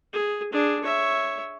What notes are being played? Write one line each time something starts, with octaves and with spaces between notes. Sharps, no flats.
G#4
D4 G#4
C#5 E5